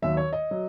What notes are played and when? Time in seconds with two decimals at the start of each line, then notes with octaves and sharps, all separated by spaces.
0.02 D#2 D#3 F#3 E5
0.17 C#5
0.33 D#5
0.51 F#3